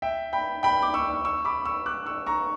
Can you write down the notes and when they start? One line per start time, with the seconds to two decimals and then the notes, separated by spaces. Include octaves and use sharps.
0.02 E5 G5
0.33 G5 B5
0.63 G5 B5
0.83 D6
0.94 C#6 E6
1.25 C#6 E6
1.45 B5 D6
1.65 C#6 E6
1.86 D6 F#6
2.06 C#6 E6
2.27 A#5 C#6